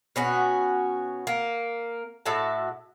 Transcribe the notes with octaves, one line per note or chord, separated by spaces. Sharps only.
B2 C#4 F#4
A#3
A2 F#4 E5 A5